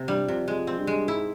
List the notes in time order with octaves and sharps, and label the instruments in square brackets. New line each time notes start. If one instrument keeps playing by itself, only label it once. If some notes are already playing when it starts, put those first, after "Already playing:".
Already playing: [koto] C3
[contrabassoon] G2 [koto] G3
[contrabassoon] F2 [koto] C3
[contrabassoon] F2 [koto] G#3
[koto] C4
[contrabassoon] G2
[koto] G#3
[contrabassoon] G#2 [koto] E4